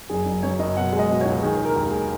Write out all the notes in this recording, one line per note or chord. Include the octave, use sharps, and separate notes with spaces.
F#1 G#4
F#1
F#2 C#5
F#1 D#5
B2 F#5
G#3
D#5
B2
C#2 C#5
D#3 G#4
E1
A#4
D#2
G#4